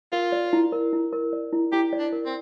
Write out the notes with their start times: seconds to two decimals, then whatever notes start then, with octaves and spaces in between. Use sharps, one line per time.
0.12 F4 A#4
0.32 D5
0.53 E4
0.72 A#4
0.93 E4
1.13 A#4
1.33 D5
1.53 E4
1.72 E4 G4
1.93 D5
1.99 D4
2.13 A#4
2.26 C4